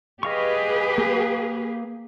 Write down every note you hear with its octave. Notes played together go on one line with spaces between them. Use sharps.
G4 G#4 B4 D#5 F5 C#6
A#3 F5